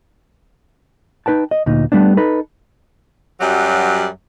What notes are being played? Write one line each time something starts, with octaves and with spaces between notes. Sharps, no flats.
D#4 B4 G5 A5
D#5
D2 A#2 D#4
G3 A3 B3 D4
D#4 A4 B4
F#2 F#3 G3